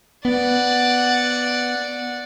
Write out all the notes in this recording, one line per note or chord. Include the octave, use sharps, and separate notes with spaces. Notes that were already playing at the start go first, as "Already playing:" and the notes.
B3 D5 F#5